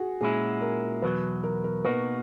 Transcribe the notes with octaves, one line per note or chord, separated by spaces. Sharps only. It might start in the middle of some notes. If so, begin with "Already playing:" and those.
Already playing: F#4 G#4
A#2 G#3 C#4 E4 G#4
A#4
E2 B2 F#3 B4
A#4
A#4
B2 A#3 D#4 F#4 B4